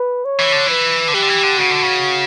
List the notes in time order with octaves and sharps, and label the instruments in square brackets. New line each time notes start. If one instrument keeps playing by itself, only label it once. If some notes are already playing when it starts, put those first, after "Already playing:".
Already playing: [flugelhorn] B4
C#5
[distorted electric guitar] E3
D3
[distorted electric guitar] E3 [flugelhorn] B4
[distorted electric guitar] D3
[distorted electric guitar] E3 [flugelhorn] G4
[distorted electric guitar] D3
E3
D3
[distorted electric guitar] C#3 [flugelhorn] F#4
[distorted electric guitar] D3
C#3